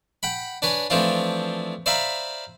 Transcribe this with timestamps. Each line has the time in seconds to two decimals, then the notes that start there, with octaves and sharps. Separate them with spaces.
0.23 F#5 G5 B5
0.62 D4 B4 C#5 G#5
0.90 E3 F3 A3 C4 D4 F4
1.86 C5 D5 E5 F5 A#5 B5